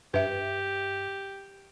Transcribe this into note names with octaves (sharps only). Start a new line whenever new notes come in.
G2 G4 B4 E5